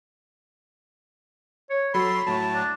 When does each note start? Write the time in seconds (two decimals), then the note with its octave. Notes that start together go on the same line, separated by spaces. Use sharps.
1.70 C#5
1.94 F#3 A4 B5 C6
2.27 A2 F#3 A5
2.54 D4